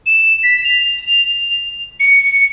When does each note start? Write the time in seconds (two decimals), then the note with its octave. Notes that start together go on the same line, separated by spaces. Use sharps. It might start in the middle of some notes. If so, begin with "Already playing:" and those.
0.06 E7
0.43 B6
0.64 F7
2.00 C#7